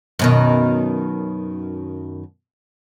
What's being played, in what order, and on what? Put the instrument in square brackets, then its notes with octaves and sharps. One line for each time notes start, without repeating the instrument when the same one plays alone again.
[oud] F#2 B2 D#3